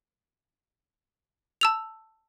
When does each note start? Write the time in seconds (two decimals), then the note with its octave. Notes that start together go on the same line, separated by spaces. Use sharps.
1.61 A5 E6 F7